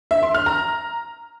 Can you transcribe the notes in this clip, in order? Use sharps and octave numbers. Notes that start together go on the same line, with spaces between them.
E5
C6
F6
A#5